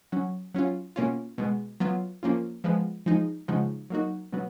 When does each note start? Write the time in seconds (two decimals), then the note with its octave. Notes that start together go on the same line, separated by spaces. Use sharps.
0.12 F#3 C#4 F#4
0.54 F#3 C#4 F4
0.96 B2 A#3 C#4 F4
1.38 B2 G#3 B3
1.80 F#3 B3 F4
2.23 F3 A#3 C#4 F4
2.64 F3 G#3 B3
3.06 F3 G#3 D#4
3.48 C#3 F3 G#3 D#4 F#4
3.90 F#3 A#3 D#4 F#4
4.32 B2 F#3 B3 F#4